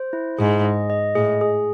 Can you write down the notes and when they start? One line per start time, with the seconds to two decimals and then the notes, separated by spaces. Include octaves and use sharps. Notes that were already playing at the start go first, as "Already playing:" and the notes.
Already playing: C5
0.13 E4
0.38 G#2 G#4
0.64 D#5
0.90 D#5
1.15 A2 G#4
1.41 G#4